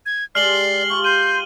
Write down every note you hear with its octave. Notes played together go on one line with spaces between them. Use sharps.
G#6
G#3 G4 D5 F6 C7 F#7 G7
F4 G4 C#6
C6 G6 D#7